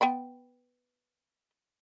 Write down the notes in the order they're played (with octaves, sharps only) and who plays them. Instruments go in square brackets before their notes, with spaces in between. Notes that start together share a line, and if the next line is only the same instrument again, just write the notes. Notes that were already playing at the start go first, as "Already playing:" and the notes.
[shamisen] B3 G5 B5